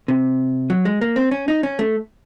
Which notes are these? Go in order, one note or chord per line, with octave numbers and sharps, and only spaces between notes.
C3
F#3
G#3
A#3
C4
C#4
D#4
C#4
A3